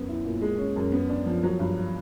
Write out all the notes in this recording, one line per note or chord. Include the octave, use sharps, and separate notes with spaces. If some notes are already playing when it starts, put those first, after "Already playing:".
Already playing: F#2 B3
E4
A#2
G#3
C#4
F#2
B3
D4
F3
F#3
G2